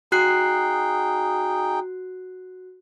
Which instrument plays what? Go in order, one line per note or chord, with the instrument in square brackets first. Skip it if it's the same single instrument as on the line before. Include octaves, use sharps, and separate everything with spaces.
[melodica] D#4 G#4 G5 [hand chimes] F#4 F#6 C7